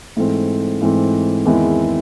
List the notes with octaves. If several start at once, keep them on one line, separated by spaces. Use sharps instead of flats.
G#2 E3 A3 C4
G#2 E3 A3 C4
E2 D#3 G#3 C4 E4